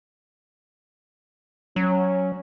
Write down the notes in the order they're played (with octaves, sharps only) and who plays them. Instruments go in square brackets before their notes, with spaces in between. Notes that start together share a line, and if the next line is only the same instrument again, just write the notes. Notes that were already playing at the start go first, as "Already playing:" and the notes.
[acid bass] F#3 [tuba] C#4